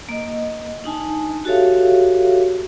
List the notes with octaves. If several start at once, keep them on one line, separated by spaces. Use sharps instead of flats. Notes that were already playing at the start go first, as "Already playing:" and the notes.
A#3 D#5
D4 D#4 G#5 A5
F#4 G4 A4 C#5 E5 F5